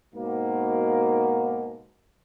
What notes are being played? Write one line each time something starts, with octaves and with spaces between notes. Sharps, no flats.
G#2 B2 A#3